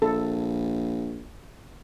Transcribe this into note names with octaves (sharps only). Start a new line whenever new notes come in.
A#1 A4